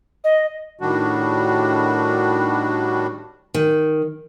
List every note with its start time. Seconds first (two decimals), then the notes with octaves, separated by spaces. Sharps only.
0.24 D#5
0.81 A2 D#3 G3 D4 F#4
3.54 D#3